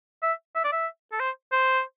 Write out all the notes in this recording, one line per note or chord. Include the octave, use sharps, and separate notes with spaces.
E5
E5
D5
E5
A4
C5
C5